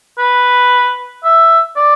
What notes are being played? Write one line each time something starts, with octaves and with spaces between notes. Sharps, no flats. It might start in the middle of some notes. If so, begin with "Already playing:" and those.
B4
E5
D5